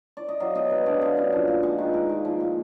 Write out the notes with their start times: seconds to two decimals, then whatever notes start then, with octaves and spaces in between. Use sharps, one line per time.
0.17 D5
0.29 D#5
0.40 F#3 F5
0.55 B2 D#5
0.71 G#3 B4
0.86 D3 D5
1.01 D3 F5
1.17 F#2
1.32 F3
1.48 A#2
1.63 G#3 F#5
1.78 D#3 B4
1.94 G#3 A#4
2.09 A#2
2.25 F3
2.40 A#2